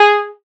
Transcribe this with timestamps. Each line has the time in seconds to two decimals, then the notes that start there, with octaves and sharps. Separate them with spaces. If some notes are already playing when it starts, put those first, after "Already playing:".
Already playing: G#4